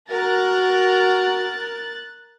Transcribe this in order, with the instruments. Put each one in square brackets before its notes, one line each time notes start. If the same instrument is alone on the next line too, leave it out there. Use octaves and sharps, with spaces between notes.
[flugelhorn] F#4 [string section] A#4 [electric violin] F#6 A6